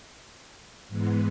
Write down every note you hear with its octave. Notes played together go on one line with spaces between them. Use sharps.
G#2 E3 G#3 B3